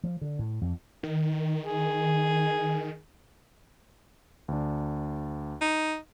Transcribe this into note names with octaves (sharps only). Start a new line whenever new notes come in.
F3
D3
A2
F2
D#3
G#4
D2 D4
D#4